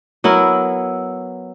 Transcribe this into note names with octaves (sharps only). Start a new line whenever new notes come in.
F#3 B3 E4 A#4